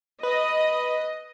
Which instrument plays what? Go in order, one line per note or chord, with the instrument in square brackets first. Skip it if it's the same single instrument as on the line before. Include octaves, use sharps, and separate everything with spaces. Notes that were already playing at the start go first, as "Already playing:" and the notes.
[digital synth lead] B4 [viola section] D#5